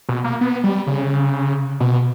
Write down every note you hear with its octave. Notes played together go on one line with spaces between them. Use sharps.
B2
A#3
B3
G3
C#3
B2